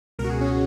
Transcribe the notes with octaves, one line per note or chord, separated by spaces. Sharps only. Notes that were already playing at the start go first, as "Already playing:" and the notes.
C#2 B2 A#4
F#4
G#4
C#4